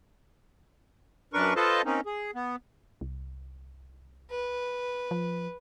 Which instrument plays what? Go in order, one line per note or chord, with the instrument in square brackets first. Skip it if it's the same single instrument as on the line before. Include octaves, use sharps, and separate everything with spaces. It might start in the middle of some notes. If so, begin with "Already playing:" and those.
[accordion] F#2 D4 A#4 B4 C#6
F4 A4 B4 C5 D#5 A5
A#3 C4 C#4 D#4
G#4
B3
[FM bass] C2
[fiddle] B4
[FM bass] F3